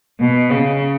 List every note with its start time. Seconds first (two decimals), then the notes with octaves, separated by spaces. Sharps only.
0.20 B2
0.50 C#3